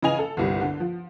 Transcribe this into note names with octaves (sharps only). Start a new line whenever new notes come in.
C#3 E3 D#5 G#5 F7
A4
G1 C2 G3
D3
F3